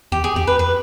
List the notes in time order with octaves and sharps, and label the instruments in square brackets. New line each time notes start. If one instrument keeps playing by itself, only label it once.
[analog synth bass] E2 [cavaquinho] G4
[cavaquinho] G#4
[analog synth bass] F2 [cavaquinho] G4
[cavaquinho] B4
B4